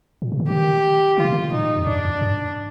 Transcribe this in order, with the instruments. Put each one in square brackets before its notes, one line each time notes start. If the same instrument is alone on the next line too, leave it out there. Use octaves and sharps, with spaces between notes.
[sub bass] A#2
C3
D3
[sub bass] D#3 [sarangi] G4
[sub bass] D3 [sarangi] F4
[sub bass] C3
D3
[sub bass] A#2 [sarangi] D#4
[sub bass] F2
[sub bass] G2 [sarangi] D4
[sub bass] F2
G2